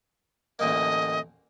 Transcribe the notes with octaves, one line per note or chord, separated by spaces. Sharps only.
A1 D2 A#3 D#5